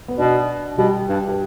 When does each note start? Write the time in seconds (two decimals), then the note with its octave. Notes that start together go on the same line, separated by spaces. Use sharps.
0.08 B3
0.18 B2 D4
0.78 B2 G3 G4
1.09 G2
1.29 G4